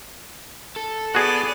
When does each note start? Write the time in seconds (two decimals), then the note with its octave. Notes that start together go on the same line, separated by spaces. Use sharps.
0.76 A4
1.15 B3 F#4 G#4 D5 D#7